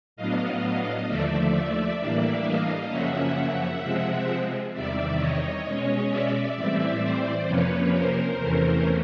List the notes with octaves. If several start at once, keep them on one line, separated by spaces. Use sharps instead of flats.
A2 F#3 B3 D4 D#5 F5
D#2 D3 F3 A3 D5 E5
A2 E3 G3 A#3 D4
D#5 F5
F#2 C#3 F3 A#3 C#4 E5 F#5
C3 F3 G#3 C4
E2 C3 D#3 G3 D5 E5
C#5 D#5
B2 G#3 C#4
D5 E5
A2 E3 G3 C4
C5 D5
F2 C3 F3 A#3 C#4 B4 C#5
A#4 C5
E2 C3 E3 A3 C#4